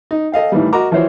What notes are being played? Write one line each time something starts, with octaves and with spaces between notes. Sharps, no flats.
D#4
A4 D#5 F5 G5
A2 D#3 E3 G3
F#4 A#4 D#5 A#5 D6
E3 F3 E4 F#4 C5 C#5